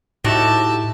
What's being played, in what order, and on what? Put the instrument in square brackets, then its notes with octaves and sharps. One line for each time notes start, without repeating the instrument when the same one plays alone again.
[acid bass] A2 [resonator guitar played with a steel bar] D#4 F#4 G4 [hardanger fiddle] E5 A5